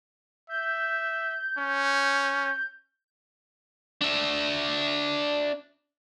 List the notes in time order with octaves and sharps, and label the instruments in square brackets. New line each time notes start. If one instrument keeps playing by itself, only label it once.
[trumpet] E5 [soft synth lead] G6
[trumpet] C#4
[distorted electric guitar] D4 E5